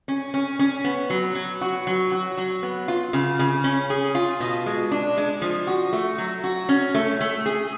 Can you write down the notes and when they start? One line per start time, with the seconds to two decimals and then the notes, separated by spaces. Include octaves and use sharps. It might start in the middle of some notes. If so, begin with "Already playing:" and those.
0.08 C#4
0.34 C#4
0.59 C#4
0.84 B3
1.10 F#3
1.35 F#3
1.61 F#4
1.87 F#3
2.12 F#4
2.37 F#3
2.63 B3
2.88 F4
3.13 C#3
3.39 C#3
3.64 C#4
3.90 G#4
4.15 F4
4.40 B2
4.66 G#3
4.91 D4
5.17 G#3
5.42 F3
5.67 F#4
5.93 A3
6.18 F#3
6.44 F#4
6.69 C#4
6.94 A3
7.21 A3
7.46 G#4